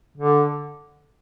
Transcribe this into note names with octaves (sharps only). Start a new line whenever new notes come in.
D3